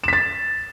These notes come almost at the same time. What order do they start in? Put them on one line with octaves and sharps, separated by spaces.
E7 B6 A6